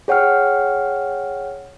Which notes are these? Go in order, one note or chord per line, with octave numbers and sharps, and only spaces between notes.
G#4 C#5 F#5 G5 F6